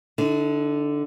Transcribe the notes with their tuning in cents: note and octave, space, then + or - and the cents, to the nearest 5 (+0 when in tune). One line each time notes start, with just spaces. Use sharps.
D3 +0 D#4 +45